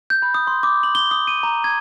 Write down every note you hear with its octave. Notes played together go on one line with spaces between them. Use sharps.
G6
B5
D#6
C6
D6
F#7
G7
D#6
D#7
A#5
G#6